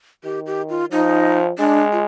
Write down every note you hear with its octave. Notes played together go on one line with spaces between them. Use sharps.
D#3 G4
G4
F4
F3 D#4
G#3 D4
F4